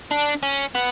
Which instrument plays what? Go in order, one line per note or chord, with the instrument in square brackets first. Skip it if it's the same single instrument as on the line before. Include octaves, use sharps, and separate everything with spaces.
[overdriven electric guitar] D4
C#4
B3